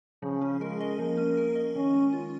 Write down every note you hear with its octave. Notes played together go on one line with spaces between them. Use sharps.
C#3 F3
C#4
G#3 A#4
D#5
F3 A#3
C#4
A#4
D#5
D#3 C#4
G#3
F4